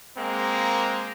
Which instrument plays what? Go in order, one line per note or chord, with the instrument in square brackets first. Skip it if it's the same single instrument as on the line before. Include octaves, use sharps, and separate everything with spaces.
[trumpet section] G#3 A#3 C4 A#5